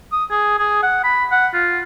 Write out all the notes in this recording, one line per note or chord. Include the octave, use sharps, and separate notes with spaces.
D#6
G#4
G#4
F#5
B5
F#5
F4